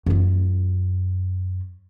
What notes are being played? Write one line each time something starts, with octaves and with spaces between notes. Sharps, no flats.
F#2 F4